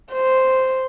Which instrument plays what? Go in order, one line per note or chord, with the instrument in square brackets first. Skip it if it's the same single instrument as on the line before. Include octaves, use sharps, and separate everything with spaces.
[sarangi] C5